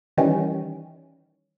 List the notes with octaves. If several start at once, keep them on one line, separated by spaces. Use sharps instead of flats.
D#3 E3 G3 C#4